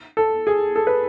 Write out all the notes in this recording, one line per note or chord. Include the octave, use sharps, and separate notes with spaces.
A4
G#4
A4
B4